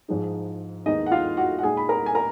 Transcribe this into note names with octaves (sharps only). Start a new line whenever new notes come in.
G#2 F3 G#3 D#4
D#2 D#3 G#3 B3 D#4 D#5
F#5
F4 F5
F#4 F#5
F#5
A#2 G#3 D#4 G#4 G#5
B5
A#4 A#5
G#5
A#4 A#5